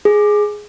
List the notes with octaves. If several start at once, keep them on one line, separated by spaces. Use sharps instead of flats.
G#4